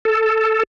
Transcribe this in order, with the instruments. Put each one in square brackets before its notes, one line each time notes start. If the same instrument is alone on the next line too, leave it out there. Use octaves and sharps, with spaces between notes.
[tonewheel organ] A4